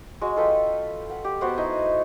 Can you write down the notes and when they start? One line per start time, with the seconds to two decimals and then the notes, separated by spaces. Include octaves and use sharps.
0.21 G#3 F#4 F#5
0.36 F4 A4 B4 G5
1.09 F#5
1.25 G4
1.41 B3 F#4 C5 F#5
1.58 D#4 E4